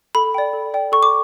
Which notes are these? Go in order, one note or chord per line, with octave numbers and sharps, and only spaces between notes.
A4 B5
D5 G5
A4
D5 G5
A4 C#6
D6